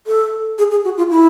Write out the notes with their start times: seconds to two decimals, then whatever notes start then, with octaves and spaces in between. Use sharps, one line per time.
0.07 A4
0.58 G#4
0.71 G#4
0.85 F#4
0.97 F4
1.11 E4